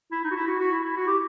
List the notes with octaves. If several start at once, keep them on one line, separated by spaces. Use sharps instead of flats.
E4
D#4
F#4
E4
F#4
F#4
E4
E4
F#4
G4